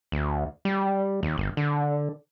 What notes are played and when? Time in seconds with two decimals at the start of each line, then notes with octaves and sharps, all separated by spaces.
0.12 D2
0.65 G3
1.23 D#2
1.38 G1
1.57 D3